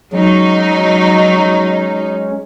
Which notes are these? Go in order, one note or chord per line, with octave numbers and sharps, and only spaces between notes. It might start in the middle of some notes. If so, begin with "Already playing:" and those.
F#3 G#3 C#4 D#4